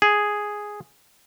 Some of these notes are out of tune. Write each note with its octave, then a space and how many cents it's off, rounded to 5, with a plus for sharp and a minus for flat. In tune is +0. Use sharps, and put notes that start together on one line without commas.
G#4 +0